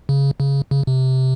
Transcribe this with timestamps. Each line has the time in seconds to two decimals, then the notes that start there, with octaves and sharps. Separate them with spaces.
0.09 C#3
0.40 C#3
0.71 C#3
0.87 C3